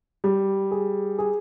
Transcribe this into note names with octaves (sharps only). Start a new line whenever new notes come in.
G3
G#4
G#4